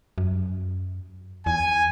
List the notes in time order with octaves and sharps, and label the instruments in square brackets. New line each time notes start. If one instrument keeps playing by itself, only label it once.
[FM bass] F#2
[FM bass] E2 [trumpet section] G#5